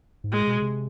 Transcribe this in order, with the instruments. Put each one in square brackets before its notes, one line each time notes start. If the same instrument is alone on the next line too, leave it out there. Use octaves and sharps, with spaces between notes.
[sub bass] G#2
[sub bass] A2 [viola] G#3
[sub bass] B2
C3